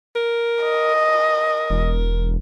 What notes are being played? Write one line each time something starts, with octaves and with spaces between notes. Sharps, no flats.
A#4
D#5
A#4
E1